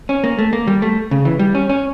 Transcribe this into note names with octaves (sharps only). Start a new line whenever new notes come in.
C#4
A#3
A3
A#3
G3
A3
C#3
E3
G3
C#4
C#4